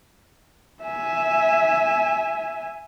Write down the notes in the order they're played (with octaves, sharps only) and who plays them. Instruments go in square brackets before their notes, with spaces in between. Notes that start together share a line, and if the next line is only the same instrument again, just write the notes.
[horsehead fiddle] E5 G#5